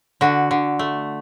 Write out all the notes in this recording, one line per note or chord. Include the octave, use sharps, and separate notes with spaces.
D3 F#4
D3
A3